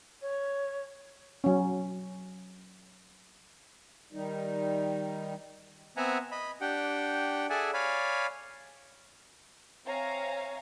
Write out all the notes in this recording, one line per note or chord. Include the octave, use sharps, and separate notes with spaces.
C#5
F#3 C#4
D#3 G3 D#4
B3 C4 E5 F#5 G#5 A#5
D#5 B5
D4 G4 F#5 G5
G#4 A4 D5 E5 F#5 G#5
C#5 D5 F5 G#5 B5
C4 C#5 E5 F5 G#5 A#5